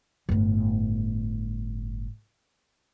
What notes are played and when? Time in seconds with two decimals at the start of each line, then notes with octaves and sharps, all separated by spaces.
0.29 G1 A2